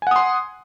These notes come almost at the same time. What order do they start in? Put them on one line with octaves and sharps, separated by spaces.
G#5 F#5 D#6 C6